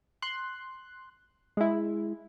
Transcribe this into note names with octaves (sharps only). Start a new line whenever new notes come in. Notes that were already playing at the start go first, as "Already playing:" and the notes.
C6 F#6
G#3 E4